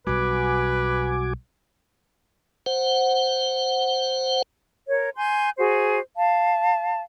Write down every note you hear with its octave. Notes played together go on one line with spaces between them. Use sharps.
B1 G3 F#4 B4 G#5 D6
C5 F#5
A#4 C#5
G#5 C6 G6
F#4 G#4 C5
F5 A5